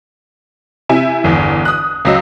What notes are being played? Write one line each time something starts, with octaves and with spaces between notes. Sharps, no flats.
C3 E4 G#5
G1 E2
D#6 F#6
C#2 F#3 D#5 E6